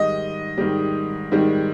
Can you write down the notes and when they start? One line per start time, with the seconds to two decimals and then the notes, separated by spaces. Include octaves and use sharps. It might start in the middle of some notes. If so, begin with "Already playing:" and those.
Already playing: G#2 D#3 G3 D#5
0.58 G#2 D#3 G3
1.32 G#2 D#3 G3